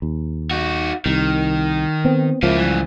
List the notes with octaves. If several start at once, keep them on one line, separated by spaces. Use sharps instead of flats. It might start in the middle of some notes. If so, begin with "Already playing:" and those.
D#2
D#4 F#4
C2 D#3
B3 C4
C#2 F3 A#3 E4
G2 E3